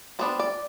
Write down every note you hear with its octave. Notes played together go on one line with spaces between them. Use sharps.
G3 B3 D4 C5
D5